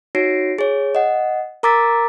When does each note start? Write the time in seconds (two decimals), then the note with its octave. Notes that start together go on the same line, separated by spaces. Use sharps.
0.15 D#4 F#4 C#5 A#6 C7 D7
0.58 G#4 C#5
0.95 D#5 F#5
1.63 A#4 A#5 D6 E6 A6 B6